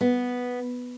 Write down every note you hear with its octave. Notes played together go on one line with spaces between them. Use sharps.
B3